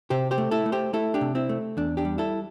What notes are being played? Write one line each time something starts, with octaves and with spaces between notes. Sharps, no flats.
C3 G4 C5
G4 C5
A3
E4 A4
A3
G4 C5
A3 E4 A4
D4 G4
C3
C4 E4
A3
E2 D4
D4 G4
G3
E4 A4